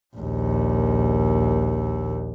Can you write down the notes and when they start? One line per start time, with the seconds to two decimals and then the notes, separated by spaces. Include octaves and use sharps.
0.16 A#1 D#2